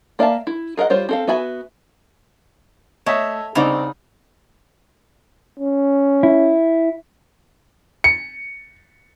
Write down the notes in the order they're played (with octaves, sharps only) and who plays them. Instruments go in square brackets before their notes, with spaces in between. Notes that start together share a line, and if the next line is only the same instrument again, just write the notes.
[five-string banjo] A#3 D5 E5 F5 A5
E4
G#4 A#4 D#5 F#5
G3 F4 C5 C#5
C4 A4 F5
B3 F#4 E5 G#5 B5
[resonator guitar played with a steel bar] A3 [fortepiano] C#5 D#5 E5
[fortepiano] C2 C4 D5 [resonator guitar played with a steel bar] C#3 D#4
[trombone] C#4
[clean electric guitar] E4
[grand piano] C#7